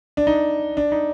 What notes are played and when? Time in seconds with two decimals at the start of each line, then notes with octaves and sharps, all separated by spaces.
0.17 D4
0.27 D#4
0.77 D4
0.92 D#4